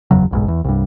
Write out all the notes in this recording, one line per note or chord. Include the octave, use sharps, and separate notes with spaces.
F#1 E2 C#3 F#3
F#1 B1 G#2
E2
C2 G2